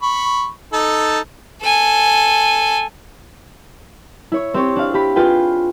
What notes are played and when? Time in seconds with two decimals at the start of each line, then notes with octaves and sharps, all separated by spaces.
0.02 B5 C#6
0.73 D#4 A4 A5
1.62 A4 G#5
4.32 E4 C#5
4.54 C4 G4 C#5
4.76 D4 F5
4.94 G4 B5
5.16 F4 G#4 B4 G5